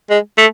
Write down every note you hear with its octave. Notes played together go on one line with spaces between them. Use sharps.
G#3
A3